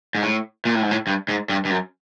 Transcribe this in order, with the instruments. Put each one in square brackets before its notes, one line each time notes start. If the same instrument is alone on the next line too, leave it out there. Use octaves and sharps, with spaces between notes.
[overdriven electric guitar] G#2
A2
A#2
A2
G#2
A2
G2
G#2
G2
G2
F#2